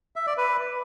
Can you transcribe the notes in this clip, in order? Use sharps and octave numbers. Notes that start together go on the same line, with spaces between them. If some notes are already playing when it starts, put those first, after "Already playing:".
E5
D5
B4